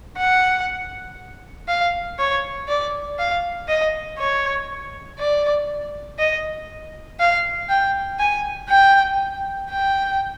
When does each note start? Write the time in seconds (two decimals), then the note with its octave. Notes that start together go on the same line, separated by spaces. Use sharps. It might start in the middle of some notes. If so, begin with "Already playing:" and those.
0.18 F#5
1.68 F5
2.18 C#5
2.68 D5
3.19 F5
3.68 D#5
4.18 C#5
5.19 D5
6.19 D#5
7.19 F5
7.69 G5
8.19 G#5
8.69 G5
9.69 G5